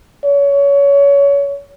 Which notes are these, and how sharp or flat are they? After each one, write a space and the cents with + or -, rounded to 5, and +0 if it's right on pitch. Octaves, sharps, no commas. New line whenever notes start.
C#5 +25